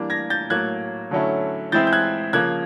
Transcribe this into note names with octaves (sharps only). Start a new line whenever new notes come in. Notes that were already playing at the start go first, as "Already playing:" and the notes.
Already playing: E3 G3 A#3 D4
G#6 A#6
G6 A6
A2 F#3 A#3 F#6 G#6
D3 F#3 A3 C#4 E4
E3 G#3 C4 E4 G6 A6
G6
F#6 G#6
C#3 F3 A#3 F#6 G#6